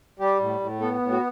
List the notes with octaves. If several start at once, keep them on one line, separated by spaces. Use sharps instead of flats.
G3 G4
A2
A2
B3 A4
A2
F#4